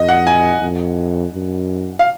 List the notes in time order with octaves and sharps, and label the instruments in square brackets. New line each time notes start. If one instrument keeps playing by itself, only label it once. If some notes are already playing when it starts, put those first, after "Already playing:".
Already playing: [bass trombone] F2 [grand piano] D#5
[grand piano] F#5
G#5
[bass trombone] F2
F#2
[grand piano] F5